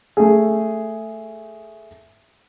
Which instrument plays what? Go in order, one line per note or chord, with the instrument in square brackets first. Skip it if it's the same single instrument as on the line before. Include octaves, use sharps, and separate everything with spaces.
[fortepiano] A3 G#4